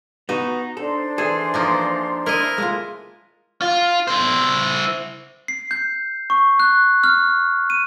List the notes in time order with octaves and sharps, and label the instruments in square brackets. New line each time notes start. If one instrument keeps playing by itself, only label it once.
[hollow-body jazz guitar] B3 F#4 [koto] D#4
[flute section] D4 C5 [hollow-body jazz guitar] A4
[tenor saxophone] E3 [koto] G#4 [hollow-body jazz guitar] A4
[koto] F3 A#3 D#4
[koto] E4 D#5 [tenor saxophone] A#4
[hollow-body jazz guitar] G#3 A3 F4
[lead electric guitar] F4
E4 C5
[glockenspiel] C7
G6
C#6
F#6
F6
D#7